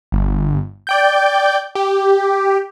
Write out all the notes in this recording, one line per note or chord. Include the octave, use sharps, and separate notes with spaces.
G1
D5 G5 G6
G4